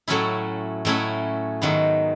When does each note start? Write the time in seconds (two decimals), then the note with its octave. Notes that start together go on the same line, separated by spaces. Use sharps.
0.08 A2 F#3 A3 C#4 E4
0.85 A2 F#3 A3 C#4 E4
1.62 G#2 D#3 F#3 B3